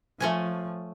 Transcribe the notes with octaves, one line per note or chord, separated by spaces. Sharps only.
F3 A3 C#4 G#5